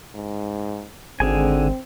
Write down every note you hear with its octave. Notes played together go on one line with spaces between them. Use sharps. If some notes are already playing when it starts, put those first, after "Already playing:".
G#2
G#1 D3 C4 G#4 G#5